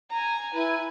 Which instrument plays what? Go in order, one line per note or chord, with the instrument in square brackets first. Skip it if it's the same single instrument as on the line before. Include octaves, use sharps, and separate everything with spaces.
[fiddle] G#5 A#5
[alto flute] E4 [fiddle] B4 G#5